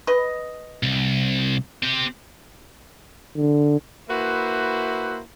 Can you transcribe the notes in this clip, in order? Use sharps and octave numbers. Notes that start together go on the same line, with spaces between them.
B4 D#5
C2
C4 G4
D3
A#3 E4 F#4 B4 C5 E5